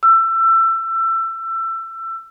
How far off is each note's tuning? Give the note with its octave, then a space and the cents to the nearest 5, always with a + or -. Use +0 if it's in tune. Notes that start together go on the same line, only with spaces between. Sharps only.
E6 +25